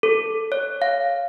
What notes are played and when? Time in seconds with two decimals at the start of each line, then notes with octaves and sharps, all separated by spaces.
0.03 A4
0.52 C#5
0.82 F5